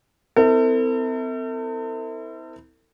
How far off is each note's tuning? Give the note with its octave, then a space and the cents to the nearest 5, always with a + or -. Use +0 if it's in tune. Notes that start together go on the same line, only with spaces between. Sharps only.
C4 -35 E4 -30 A4 +45